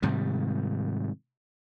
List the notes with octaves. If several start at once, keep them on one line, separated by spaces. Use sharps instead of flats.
G#2 C3 D#3 G3